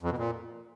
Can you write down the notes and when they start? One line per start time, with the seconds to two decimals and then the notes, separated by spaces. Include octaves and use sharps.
0.03 F2
0.10 B2
0.18 A#2